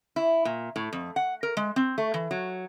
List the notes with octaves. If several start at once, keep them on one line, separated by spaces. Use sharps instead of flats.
E4
A#2
A2
F2
F#5
A#4
G#3
C4
A3
E3
F#3